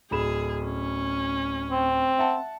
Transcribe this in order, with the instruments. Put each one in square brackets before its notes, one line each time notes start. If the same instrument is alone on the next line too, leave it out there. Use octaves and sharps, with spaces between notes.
[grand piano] D1 B5 E7 [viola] G#4
[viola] C#4
[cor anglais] C4
[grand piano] E5 F#5 A5